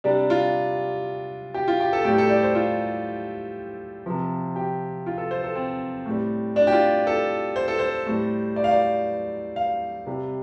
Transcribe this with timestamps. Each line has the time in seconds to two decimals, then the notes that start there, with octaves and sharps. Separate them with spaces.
0.04 C3 G3 D4
0.30 F4
1.54 G4
1.68 F4
1.80 G4
1.93 A4
2.05 A2 G3 G4
2.18 A4
2.30 D5
2.43 C5
2.55 F4
4.06 C3 F3
4.56 G4
5.06 F4
5.18 A4
5.31 C5
5.44 A4
5.55 C4
6.06 A2 G3
6.56 D4
6.67 G4
6.72 F4
7.07 A4
7.56 C5
7.68 A4
7.79 C5
8.06 A2 G3
8.56 D5
8.64 F5
8.71 D5
9.56 F5
10.06 C3 G3